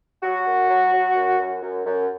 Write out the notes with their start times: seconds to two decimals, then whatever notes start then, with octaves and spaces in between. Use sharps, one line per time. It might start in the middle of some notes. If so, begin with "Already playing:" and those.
0.23 F#3 F#4
0.47 F#2
0.69 F#3
0.93 F#3
1.16 F#2
1.39 F#2
1.62 F#2
1.86 F#2